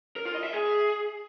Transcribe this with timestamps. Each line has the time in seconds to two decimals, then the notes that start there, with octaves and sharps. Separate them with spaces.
0.16 A#4
0.25 F4
0.35 D#5
0.44 E5
0.53 G#4